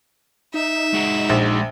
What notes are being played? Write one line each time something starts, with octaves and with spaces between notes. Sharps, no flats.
D#4 E5
G#3 F#4
A#1